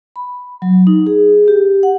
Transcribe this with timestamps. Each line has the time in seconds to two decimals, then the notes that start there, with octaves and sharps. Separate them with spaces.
0.16 B5
0.62 F#3
0.87 D#4
1.07 G#4
1.48 G4
1.83 F#5